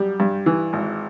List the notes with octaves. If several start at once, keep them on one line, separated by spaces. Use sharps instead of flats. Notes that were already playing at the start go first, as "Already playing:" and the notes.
Already playing: F#2 G3
G2
E3
G#1